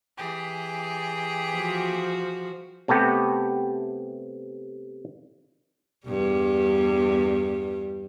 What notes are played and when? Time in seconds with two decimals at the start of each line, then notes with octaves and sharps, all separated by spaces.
0.17 E3 G4 G#4
1.53 F3 F#4
2.88 C3 A3 B3 G4
6.07 E2 G2 G3